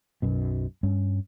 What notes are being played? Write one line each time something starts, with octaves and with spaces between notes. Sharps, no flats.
B1 F#2 B2
G2 C#4